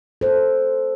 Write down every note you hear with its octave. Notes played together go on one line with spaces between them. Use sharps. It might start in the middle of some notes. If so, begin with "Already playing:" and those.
A4 C5